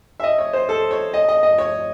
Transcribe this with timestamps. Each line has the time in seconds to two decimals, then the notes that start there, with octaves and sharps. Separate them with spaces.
0.20 E5
0.24 D#5
0.38 C#5
0.53 C5
0.69 A4
0.91 C#5
1.14 D#5
1.28 D#5
1.43 D#5
1.58 C#5